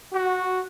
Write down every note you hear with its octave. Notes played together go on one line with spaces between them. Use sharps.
F#4